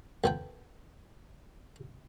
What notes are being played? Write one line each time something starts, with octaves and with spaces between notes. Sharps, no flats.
F2 B3 G5